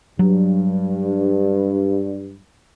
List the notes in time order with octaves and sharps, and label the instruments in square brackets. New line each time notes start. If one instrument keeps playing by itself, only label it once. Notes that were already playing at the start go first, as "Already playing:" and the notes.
[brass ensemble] G2 [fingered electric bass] F#3